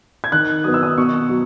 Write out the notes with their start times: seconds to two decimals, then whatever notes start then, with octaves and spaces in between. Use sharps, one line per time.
0.24 G#6
0.32 D#3 F#6
0.64 F#3 B3 D#6
0.74 E6
0.83 D#6
0.98 B2 C#6
1.29 F#3